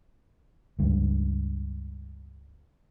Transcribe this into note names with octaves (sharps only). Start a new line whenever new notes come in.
C#2 G2 C#3